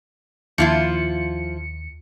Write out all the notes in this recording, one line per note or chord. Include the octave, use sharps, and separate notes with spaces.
D#2 F3 E4 F4 C#7